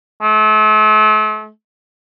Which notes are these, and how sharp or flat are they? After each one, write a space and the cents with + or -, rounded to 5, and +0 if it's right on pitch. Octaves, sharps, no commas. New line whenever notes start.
A3 -40